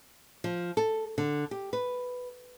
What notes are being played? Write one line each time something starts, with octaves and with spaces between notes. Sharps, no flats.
F3
A4
D3
G4
B4